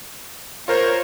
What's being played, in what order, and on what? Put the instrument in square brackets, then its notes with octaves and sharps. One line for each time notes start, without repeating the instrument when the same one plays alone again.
[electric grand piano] F4 A#4 C5 [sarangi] C#5